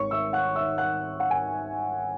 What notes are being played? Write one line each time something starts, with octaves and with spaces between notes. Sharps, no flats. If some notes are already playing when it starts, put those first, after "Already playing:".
Already playing: G#1 G#2 C#5 C#6
E5 E6
F#5 F#6
E5 E6
F#5 F#6
F#5
G#5